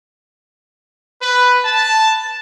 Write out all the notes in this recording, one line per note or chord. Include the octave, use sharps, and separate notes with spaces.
B4
A5